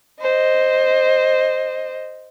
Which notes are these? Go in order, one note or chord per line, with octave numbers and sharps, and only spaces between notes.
C5 D#5